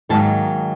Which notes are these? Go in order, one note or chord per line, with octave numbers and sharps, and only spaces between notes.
G#2 D#3 F#3 A#3 A5